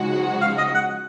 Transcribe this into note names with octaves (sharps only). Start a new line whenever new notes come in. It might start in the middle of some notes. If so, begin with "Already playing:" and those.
Already playing: C#3 F3 G#3 D#4 F#4
F5
D#5
F#5